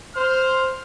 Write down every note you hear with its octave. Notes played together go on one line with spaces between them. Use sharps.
C5 F6